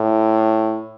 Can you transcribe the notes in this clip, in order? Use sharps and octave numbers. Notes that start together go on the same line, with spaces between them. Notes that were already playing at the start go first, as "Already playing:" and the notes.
Already playing: A2